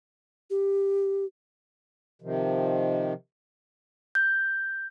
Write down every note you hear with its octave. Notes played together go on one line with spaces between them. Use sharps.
G4
C3 D#3 F3
G6